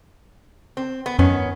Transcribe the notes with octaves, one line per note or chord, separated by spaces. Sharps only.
C4
B3
F#2 D#3 B3 C#4